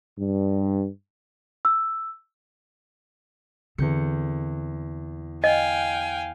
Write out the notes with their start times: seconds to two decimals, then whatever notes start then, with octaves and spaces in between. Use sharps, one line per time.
0.19 G2
1.65 E6
3.78 E2 D3 C4 G6 C#7
5.44 D#5 F5 G5 G#5